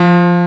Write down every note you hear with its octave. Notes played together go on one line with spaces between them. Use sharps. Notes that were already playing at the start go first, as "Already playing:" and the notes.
Already playing: F3